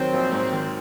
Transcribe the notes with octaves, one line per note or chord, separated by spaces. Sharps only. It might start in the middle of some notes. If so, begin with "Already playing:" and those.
Already playing: D#3 F#3 C4
A#1
G#2
D#3